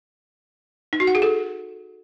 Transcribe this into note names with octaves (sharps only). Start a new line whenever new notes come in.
D#4
F#4
F#5
G#4
A4